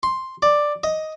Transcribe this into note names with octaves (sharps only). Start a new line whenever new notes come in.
C6
D5
D#5